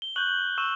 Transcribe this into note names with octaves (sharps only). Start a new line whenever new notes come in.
G7
C#6 F#6 G6 F#7
C#6 E6 E7